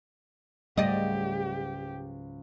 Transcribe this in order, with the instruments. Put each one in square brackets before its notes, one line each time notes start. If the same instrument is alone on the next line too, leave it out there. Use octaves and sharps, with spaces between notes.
[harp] C#2 G#2 F#3 [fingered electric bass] G3 A3 [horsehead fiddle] G4 [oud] D5 D#5